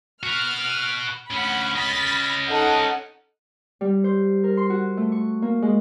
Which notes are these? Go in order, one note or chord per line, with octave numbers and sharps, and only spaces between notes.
F#4 B4 F6
D2 C#4 F#5 B5
C#4 D#5 B5 A6 B6
D#4 A4 F#5
G3
C5
A#4
C6
F#4
A3
C#6
A#3
G#3